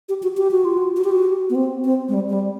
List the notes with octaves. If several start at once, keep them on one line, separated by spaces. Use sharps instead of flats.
G4
F#4
G4
F#4
F4
F#4
F#4
G4
F#4
B3
C4
C4
G#3
G3
G#3
G3